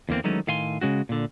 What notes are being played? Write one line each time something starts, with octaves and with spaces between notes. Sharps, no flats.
E2 D3 A#3 C4
D#3 E3 F#3 G#3 A3 C#4
A2 D#3 F5 G#5 C6
C#3 G#3 C#4 F#4
A#2 D3